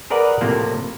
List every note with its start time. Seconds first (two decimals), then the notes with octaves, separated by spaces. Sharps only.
0.10 G#4 A#4 B4 D5 F#5
0.41 A2 C3 F3 A#3